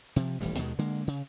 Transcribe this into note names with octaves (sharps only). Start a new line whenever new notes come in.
C3 F3
D#1 A1 E3 G3
D#2 B2 D#3 G#3
D3 G#3 A#3
C#3